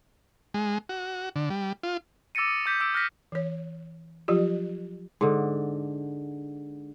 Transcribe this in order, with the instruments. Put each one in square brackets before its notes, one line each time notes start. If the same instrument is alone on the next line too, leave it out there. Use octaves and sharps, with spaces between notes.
[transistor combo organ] G#3
F#4
D3
G3
F4
[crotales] D6 E6 A6 A#6 C#7 D#7
D#6
D6 G6 B6
D6 E6 G6 D7
F6 F#6 A#6 B6
[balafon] E3 C#5
F3 F#3 F4 G4
[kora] G#2 D3